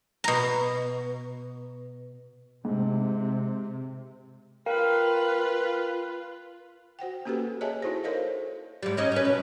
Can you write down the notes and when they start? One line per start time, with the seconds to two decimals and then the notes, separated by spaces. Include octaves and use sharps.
0.24 B2 A#5
2.65 G#2 C3
4.66 F4 A#4 B4 F5 G5
6.99 F#4 C5 F#5 G5
7.25 A#3 C#4 F#4 G4 A4 B4
7.61 G#4 C#5 D#5 E5 G#5 A5
7.82 D#4 E4 F#4 A4 C5
8.04 A4 A#4 C5 C#5 D#5 F5
8.83 G#2 G3
8.97 C#4 D#4 D#5
9.12 C#4 B4
9.25 B2